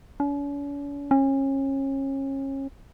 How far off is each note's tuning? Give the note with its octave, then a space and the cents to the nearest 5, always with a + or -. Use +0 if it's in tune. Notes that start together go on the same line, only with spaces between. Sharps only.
C#4 +45
C#4 -30